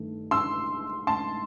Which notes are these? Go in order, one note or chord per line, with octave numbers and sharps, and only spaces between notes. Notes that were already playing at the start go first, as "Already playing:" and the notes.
Already playing: G2 D#3 A3
C6 E6
A5 C6